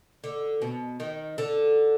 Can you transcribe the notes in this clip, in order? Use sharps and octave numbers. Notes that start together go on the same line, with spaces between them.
D3
B2
D#3
D3